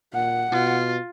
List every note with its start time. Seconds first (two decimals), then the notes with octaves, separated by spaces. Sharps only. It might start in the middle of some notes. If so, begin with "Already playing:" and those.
0.13 A#2 F#5
0.51 B2 F4